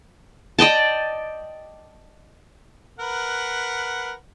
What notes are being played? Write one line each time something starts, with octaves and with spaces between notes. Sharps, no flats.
D5 D#5 G5 A5
A#4 B4 F#5